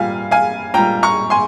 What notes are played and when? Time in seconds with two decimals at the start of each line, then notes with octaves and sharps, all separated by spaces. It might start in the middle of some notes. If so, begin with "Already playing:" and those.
Already playing: A#2 G3 F5 G#5
0.31 F5 G#5
0.74 A#2 G3 G5 A#5
1.03 A#5 C#6
1.30 G#5 C6